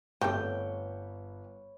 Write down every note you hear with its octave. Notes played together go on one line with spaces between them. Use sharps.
G1 G3 A3 C4 B4 C#5 G5